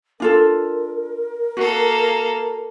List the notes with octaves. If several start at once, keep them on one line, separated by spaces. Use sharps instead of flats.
D4 F4 A4 A#4
A#3 F#4 A4